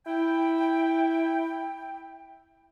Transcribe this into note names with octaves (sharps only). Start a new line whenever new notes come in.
E4 G5